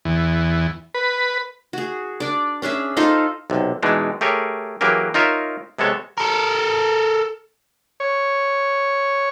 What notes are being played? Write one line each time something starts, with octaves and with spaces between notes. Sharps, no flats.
E2
B4
F#4 G#4
D4 D5
C#4 D4 G#4 E5
D#4 F4 A4 C5
B1 C3
B2 E3 G#3 D4 D#4
A3 G4 G#4 A#4 C#5
E3 F#3 A#3 G4 G#4 A#4
D#4 F4 A#4 C#5 E5
C3 G#3 B3 A4 C#5
A4 A#4
C#5